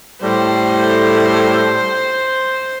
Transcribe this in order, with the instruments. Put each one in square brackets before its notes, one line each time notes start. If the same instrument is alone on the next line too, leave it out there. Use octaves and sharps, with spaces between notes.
[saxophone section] A2 G3 [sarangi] C5